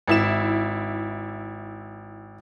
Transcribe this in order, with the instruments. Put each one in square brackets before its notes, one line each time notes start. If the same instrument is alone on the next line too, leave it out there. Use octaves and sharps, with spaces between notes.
[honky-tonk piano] G#1 E4 E7